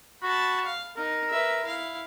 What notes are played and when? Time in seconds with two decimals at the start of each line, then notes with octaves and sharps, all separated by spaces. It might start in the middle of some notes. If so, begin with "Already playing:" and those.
0.23 F#4 A5 B5
0.65 F5
0.97 D#4 A#4
1.30 B4 E5
1.65 E4 F5